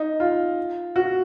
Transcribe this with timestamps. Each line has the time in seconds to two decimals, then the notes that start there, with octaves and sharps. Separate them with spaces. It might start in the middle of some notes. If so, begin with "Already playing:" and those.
Already playing: D#4
0.20 F4
0.96 F#4